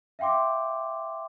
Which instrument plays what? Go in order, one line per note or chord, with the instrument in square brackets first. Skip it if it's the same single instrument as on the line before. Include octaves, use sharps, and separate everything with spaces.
[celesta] E5 F5 G5 C6 D6